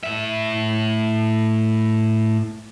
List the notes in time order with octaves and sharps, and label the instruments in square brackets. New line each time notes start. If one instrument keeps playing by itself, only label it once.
[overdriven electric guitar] A2 E5